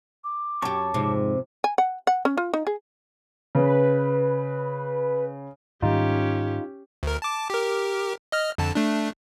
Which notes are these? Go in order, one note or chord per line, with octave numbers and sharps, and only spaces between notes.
D6
F#2 G4 C#5 A5 C#6
F2 G#2 C3
G#5
F#5
F#5
C#4
F4
D#4
G#4
C#3 B4
G#2 D#3 G3 C#4 D#4 F4 G4
D2 A#4
A5 D6
G4 A#4
D#5 F6
F2 D3 A5
A3 D4